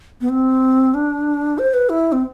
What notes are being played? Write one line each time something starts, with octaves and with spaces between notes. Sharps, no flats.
B3
C4
D4
C5
B4
E4
C4